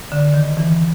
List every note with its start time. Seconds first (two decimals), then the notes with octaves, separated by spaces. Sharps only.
0.12 D3
0.34 D#3
0.57 E3